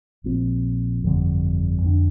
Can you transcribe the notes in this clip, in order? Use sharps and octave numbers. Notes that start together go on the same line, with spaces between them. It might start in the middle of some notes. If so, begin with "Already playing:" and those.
A#1 A#2 F3 C4
G1 F2 D3 G3
F2 D3 A#3 D4